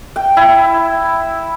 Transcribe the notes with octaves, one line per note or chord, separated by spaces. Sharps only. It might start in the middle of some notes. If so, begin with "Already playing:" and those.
G5
E4